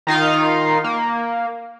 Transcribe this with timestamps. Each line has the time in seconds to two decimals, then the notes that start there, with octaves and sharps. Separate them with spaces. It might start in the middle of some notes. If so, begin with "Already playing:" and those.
0.07 D#3 D#4 F4 F5
0.84 A#3